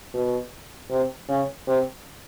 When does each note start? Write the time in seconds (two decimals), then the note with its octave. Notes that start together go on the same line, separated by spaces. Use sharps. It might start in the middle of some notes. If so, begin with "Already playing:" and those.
0.14 B2
0.90 C3
1.29 C#3
1.67 C3